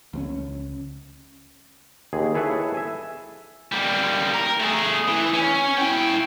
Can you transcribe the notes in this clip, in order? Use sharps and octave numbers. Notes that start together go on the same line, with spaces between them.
C#2 F3 C#4
D#2 G#4
E4 G#4 A4 B4 C#5 E5
E5 G#5
G3 A#3
A#4
A3 G#4
E3
C#4
E4 G5